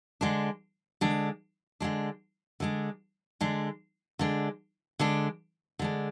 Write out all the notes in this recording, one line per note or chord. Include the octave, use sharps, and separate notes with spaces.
D3 G#3 D4
D3 G#3 D4
D3 G#3 D4
D3 G#3 D4
D3 G#3 D4
D3 G#3 D4
D3 G#3 D4
D3 G#3 D4